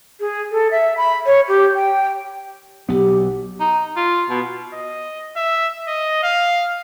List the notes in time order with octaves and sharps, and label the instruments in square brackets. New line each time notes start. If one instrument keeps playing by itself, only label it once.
[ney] G#4
A4
E5
B5
C#5
G4
G5
[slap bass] B1 B3 [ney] G4
[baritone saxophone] D#4
F4
B2
[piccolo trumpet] D#5
E5
D#5
F5